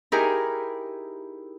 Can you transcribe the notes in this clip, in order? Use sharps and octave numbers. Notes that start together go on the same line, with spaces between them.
D#4 E4 G4 G#4 A#4